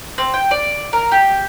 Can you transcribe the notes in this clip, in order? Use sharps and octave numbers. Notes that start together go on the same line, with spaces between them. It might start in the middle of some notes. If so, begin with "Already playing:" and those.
C4
G5
D5
A#4
G4